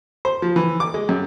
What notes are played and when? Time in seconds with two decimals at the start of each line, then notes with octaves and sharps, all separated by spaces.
0.25 C5
0.42 F3
0.56 E3
0.80 D6
0.94 G#3
1.09 F#2